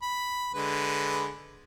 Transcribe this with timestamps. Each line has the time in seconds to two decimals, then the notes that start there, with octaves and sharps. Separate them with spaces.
0.02 B5
0.54 D3 G#3 B4